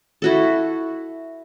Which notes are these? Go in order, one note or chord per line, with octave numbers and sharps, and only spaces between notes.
E4 F#4 A4